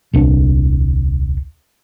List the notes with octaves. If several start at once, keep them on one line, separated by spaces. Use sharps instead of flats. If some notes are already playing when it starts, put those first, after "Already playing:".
D#1 C2 D4